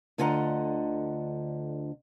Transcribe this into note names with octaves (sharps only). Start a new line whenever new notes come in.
D2 D3 F4 D#5 F#5 A#5